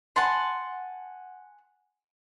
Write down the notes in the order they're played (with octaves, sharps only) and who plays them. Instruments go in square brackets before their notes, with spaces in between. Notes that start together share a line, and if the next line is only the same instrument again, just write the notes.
[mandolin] F#5 G#5 A5 C6